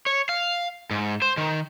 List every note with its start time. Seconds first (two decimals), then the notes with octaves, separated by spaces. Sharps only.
0.06 C#5
0.29 F5
0.91 G#2
1.22 C5
1.37 D#3